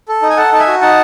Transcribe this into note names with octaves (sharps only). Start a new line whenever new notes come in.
A4
D#4
G#5
A4 F#5 A5
D#4 A5
E5 G#5
F#4
D#4 F#5 A5